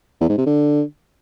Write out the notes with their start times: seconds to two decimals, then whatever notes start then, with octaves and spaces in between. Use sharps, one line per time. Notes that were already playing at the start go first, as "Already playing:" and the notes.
0.21 E2
0.29 G#2
0.38 C3
0.46 D3